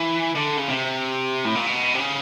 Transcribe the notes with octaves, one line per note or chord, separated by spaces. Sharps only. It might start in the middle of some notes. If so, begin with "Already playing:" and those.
Already playing: E3
D3
C#3
C3
A2
A#2
B2
C3
C#3